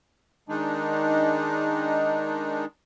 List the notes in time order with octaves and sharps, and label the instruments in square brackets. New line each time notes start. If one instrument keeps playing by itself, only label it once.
[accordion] D#3 G#3 D4 D#4